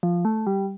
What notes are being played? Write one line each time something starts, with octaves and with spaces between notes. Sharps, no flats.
F3
A3
G3